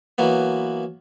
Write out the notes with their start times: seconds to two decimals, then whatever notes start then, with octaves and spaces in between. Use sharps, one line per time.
0.18 E3 F#3 A#3 B3